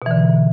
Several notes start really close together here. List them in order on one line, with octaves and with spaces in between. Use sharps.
B2 E3 D3